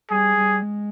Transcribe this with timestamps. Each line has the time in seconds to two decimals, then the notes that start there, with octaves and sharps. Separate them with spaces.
0.10 G3 G#4
0.37 G3
0.62 G#3